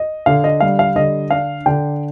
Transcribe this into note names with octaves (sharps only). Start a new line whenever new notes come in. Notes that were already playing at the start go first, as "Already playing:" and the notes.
Already playing: D#5
D3 F5
D#5
G3 F5
F5
D3 D#5
D4 F5
D3 G5